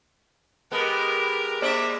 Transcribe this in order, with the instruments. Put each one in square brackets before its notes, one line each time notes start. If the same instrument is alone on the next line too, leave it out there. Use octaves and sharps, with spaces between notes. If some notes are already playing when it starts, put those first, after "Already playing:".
[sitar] G#3 B3 [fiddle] G4 A#4
[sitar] G#3 A#3 D5 [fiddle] E5